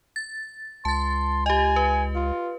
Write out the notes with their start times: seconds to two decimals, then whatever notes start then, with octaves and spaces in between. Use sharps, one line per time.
0.16 A6
0.85 C#2 A5 C6 A6
1.46 G4 D#5 G#5
1.76 B4
2.16 F4